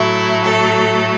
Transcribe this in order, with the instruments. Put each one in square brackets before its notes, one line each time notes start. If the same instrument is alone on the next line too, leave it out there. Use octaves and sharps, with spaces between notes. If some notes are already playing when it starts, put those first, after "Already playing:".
Already playing: [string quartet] A2 F#3 A3 E4
A4